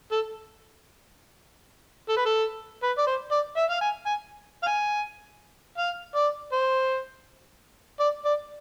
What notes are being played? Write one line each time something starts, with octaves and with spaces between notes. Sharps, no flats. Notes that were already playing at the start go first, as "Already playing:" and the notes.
A4
A4
B4
A4
B4
D5
C5
D5
E5
F5
G#5
G#5
F5
G#5
F5
D5
C5
D5
D5